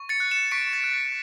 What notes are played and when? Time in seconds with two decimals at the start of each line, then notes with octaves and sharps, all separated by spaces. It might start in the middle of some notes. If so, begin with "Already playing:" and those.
Already playing: C#6
0.09 A6 C#7
0.20 F#6
0.31 C#7 E7
0.51 C#6 B6 D7
0.73 A6
0.84 F#6
0.94 B6